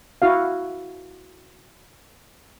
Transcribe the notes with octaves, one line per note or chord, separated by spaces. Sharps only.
E4 F#4 F5